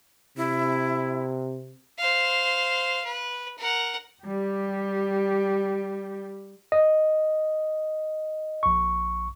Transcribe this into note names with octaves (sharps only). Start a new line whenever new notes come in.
C3 E4
C5 F5
B4
A#4 F#5
G3 G4
D#5
A#1 C#6